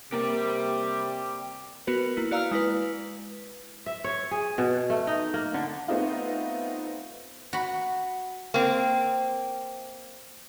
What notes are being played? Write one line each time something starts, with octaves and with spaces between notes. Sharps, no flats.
C3 A#3 G4 D5
B3 F#4 A#4 B4
A#3 E4
F#4 D5 F5 A#5 E6 F6
G#3 E4 B4
E5
C#5
G#4
B2
A3
D#4
A#3
D3
A3 B3 C4 D#4 F4
F#4 B5
A#3 C4